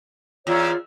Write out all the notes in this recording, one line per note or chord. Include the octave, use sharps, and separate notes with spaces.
E2 F4 C#5 D5